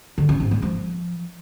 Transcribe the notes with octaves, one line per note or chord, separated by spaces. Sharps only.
D3
C#4
G#2
G#3
F3